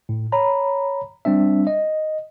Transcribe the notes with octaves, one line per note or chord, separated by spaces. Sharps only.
A2
C#5 A#5 B5
G3 C4 D4 E5
D#5